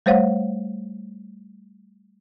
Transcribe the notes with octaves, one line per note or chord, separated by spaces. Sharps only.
G3 A3 C5 C#5 F5 F#5